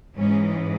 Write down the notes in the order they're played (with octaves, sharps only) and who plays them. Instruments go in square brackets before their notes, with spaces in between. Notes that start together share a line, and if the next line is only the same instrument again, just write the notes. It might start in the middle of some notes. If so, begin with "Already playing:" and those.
[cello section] G#2 E3 G#3 C#4